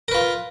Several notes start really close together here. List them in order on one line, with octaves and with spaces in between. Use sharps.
A#4 B4 F4